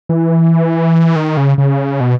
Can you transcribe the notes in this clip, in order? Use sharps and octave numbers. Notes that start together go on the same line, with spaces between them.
E3
D#3
C#3
C#3
B2